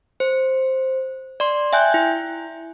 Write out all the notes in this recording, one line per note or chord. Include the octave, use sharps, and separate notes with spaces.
C5
D5 C6
E5 G5 G#5 F#6 G6
E4